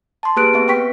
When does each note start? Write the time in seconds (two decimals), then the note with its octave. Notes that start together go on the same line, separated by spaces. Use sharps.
0.23 A5 C6
0.36 A#3 G4 G#4 B4 F#6 D7
0.53 B3 C4 E5
0.68 B4 G5 C#6 B6